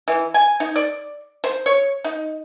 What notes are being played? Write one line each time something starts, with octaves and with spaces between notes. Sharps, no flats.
E3
G#5
D#4
D5
C5
C#5
D#4